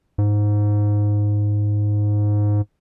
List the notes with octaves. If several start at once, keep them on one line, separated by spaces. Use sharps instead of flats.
G#2